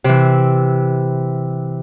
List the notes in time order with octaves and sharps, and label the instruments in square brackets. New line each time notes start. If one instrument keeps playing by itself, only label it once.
[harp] C3 E3